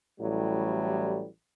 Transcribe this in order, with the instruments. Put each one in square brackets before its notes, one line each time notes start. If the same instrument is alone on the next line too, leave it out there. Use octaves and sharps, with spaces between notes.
[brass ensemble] A1 A2 F#3 G3